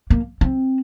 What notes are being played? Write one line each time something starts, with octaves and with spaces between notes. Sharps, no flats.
A#3
C4